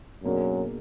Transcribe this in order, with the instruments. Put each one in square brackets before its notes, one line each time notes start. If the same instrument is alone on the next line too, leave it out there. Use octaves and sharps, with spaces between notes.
[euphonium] F#2 [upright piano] B2 A#3 D4 G#4 D5